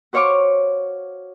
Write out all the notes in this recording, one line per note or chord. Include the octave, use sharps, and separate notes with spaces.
F#4 C5 C#5 F5 C#6 D6